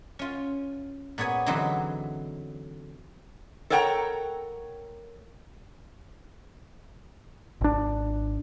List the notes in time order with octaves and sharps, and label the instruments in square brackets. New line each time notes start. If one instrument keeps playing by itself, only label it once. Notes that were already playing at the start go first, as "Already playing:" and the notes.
[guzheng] C#4 F4
A#2 B3 G#4 C#5 G#5
D3 E3 F#3 C4 D#4 B4
[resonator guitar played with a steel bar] A4 A#4 C#5 F#5 G5 A#5
[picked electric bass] G#1 D4